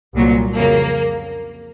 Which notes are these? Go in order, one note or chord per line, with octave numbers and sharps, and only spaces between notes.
C2 A#2 F#3
F2 C#3 F#3 A#3